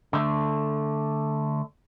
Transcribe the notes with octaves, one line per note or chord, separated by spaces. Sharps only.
D3 A3